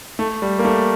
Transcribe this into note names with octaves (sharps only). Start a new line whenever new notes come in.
A3
G3
A#3
A3